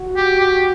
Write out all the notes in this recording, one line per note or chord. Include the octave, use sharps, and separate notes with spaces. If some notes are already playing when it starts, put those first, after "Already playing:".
Already playing: F#4
G4
G4